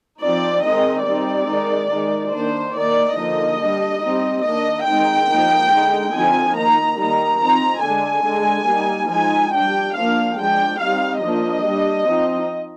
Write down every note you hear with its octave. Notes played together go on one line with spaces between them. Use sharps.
F3 C4 D#4 D5
D#3 G#3 C4 D#4 D#5
G3 C4 D#4 D5
D#3 G#3 D#4
D#3 G#3 D#4
D#3 A#3 D4 C5
D#3 A#3 D#4 D5
D3 F3 A#3 D#4 D#5
G3 D4
G3 C4 D#4
D#3 A#3 D4 D#5
D#3 G#3 C4 D#4 G5
F3 A#3 D#4
D3 G#3 D#4
D3 F3 C4 D#4 G#5
D#3 A#3 D#4 A#5
D#3 G3 A#3 D#4 A#5
F3 C4 D#4 A#5
D3 G#3 D4 G#5
D3 G#3 D4
G3 A#3 D#4
F3 G#3 D#4 G#5
G3 D4 G5
F3 A#3 D4 F5
F3 G#3 D4 G5
G3 C4 D#4 F5
F3 A#3 D4 D#5
G3 D4
F3 C4 D#4